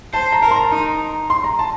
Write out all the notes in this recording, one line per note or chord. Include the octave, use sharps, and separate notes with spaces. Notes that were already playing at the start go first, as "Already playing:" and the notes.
C5 A5
A#5
A#4 A5
C6
A#5
D#4
C6
A#5
A5